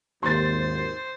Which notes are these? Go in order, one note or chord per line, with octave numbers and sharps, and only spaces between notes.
G#1 D#2 C5 C6 A6